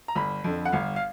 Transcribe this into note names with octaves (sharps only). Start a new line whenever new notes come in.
A#5
G1 B5
F2 D3
F#5
G1 F5
F5